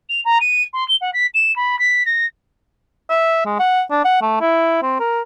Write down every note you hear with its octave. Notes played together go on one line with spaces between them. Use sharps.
F7
A#5
D#7
C6
G7
F#5
B6
E7
B5
B6
A#6
E5
G#3
F#5
D4
F#5
A3
E4
C4
A#4